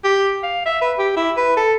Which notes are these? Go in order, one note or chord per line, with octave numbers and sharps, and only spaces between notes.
G4
F5
E5
B4
G4
E4
B4
A4